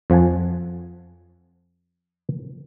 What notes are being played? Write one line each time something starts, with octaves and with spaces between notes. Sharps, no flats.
F2 F3 F#5 G#5 A5